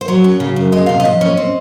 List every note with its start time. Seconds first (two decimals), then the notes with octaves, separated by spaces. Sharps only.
0.01 C5
0.08 F#3 C#5
0.24 F#2
0.40 C#3
0.56 F#2
0.72 G#3 D#5
0.86 C3 F5
1.00 D#5
1.05 F3
1.21 C#4
1.37 C4